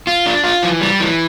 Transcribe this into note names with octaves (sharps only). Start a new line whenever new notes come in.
F4
D4
F4
E3
G3
E3